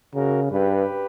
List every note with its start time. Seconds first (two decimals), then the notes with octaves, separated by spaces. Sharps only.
0.14 C#3 F#4 A#4
0.51 G2 G4 B4